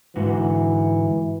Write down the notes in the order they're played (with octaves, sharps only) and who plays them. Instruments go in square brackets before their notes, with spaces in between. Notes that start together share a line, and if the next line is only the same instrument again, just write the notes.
[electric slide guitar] G#2 D3 F#4 [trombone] E3